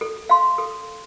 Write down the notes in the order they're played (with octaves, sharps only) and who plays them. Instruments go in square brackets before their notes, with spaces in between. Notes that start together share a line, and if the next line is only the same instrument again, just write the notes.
[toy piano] A4
F5 C6
A4